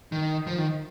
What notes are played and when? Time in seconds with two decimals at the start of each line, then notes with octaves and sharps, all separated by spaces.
0.12 D#3
0.47 F3
0.58 D#3